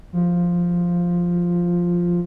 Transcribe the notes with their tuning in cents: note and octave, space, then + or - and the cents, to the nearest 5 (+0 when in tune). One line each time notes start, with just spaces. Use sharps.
F3 +0